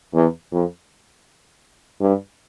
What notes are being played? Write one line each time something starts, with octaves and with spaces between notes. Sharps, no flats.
E2
F2
G2